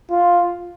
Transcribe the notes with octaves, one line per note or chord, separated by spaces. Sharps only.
F4